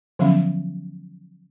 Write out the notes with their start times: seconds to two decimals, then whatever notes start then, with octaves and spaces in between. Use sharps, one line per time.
0.19 D3 F3 F#3 B3 C#4